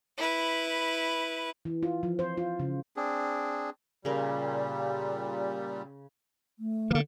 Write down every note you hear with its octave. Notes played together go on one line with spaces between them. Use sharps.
E4 B4
E3
F4
F3
C5
F4
C#3
C4 D4 G#4
A#2 C#3 G3 A#4
A3
D3 E3 A#3